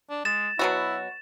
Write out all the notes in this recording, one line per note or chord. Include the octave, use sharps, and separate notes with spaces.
D4
G#3 A6 E7
B2 F#3 E4 F#4